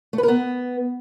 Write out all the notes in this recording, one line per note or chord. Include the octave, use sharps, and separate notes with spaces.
A3
B4
A#4
B3